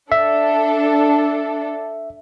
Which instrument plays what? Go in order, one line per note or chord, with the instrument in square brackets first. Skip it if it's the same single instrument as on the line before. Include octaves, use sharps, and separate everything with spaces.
[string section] D4 A4 [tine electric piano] E5